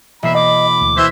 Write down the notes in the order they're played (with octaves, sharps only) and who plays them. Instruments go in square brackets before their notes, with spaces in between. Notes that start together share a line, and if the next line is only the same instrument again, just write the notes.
[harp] E1 A#3 C7 [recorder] E5 [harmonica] B5
[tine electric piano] D#5 [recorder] D6
[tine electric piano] D2
[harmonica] E3 C5 E5 [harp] B6